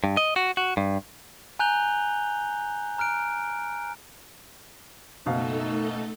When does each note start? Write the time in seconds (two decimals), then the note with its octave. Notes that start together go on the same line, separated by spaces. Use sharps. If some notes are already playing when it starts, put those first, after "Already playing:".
0.04 G2
0.17 D#5
0.36 F#4
0.57 F#4
0.77 G2
1.59 G#5 A#5 F#6 G6 F7 G7
2.98 A#5 F6 F#6 D7
5.26 F#1 B2 A3 D#4 A4 F5